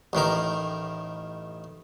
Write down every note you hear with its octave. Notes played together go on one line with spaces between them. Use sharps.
A1 A2 D#3 A#4